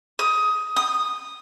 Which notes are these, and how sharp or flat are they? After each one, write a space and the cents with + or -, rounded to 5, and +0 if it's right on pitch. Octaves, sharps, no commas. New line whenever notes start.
D#6 +15
D#6 -10